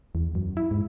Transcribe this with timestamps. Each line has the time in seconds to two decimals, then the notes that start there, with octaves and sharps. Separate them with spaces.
0.15 E2
0.35 F#2
0.57 E4
0.71 G#2